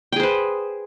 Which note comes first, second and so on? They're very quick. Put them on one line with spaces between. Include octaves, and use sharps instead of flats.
G5 G#4 C5 B4